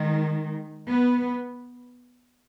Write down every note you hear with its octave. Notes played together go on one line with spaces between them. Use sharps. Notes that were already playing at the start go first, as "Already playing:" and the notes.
Already playing: D#3 G#3
B3